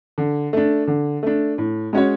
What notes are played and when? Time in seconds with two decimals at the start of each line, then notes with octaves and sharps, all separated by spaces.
0.18 D3
0.53 A3 D4
0.88 D3
1.23 A3 D4
1.58 A2
1.93 G#3 C#4 F#4 C#5